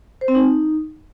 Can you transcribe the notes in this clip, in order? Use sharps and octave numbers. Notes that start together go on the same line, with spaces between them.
C5
C4
D#4